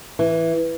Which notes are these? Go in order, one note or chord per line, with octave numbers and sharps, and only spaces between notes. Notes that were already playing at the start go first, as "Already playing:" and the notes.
E3